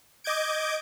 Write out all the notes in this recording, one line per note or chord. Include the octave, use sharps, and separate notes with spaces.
D#5 D6 G6 G#6 D7